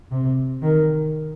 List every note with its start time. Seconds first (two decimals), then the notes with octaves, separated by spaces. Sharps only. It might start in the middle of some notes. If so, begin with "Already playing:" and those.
0.11 C3
0.62 D#3